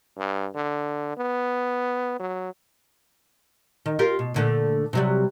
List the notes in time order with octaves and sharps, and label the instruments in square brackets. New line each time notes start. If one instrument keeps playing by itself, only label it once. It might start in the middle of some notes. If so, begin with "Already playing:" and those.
[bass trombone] G2
D3
B3
F#3
[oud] D#3
F4 G4 A#4
B2
A#2 D3 A3
C3 F#3 G3